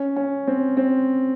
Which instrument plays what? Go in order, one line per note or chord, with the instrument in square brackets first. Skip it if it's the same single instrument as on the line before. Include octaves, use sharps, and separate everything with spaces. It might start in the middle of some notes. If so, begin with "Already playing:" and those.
Already playing: [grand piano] C#4
C#4
C4
C4